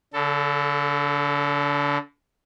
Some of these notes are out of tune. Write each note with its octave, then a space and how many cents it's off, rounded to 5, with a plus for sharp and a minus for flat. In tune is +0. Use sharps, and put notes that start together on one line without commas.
D3 -35 A4 +10